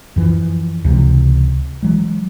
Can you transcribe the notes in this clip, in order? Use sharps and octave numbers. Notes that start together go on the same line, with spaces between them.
F#2 E3 F3
C#2 C3 E3
E3 F#3 G#3